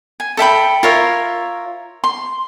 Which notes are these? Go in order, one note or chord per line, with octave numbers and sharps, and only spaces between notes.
G#5
A4 E5 G5 B5
F4 A#4 C#5 E5
C6